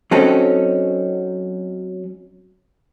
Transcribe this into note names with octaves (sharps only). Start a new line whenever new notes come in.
F#3 C4 C#4 D#4 A4